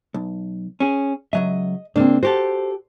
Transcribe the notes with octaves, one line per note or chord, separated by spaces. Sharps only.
B1
C#4 G#4
C#2 F#3 D#5 E5
C#2 A#3 C4 D4
F#4 G4 A4 C5